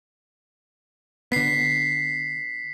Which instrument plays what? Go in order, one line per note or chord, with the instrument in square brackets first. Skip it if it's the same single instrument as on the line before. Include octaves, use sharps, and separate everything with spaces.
[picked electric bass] D3 B3 [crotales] B6 C7